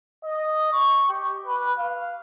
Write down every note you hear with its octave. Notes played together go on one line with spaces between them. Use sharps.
D#5
C#6
G4
B4
F5